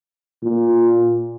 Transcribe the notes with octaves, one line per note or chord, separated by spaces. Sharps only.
A#2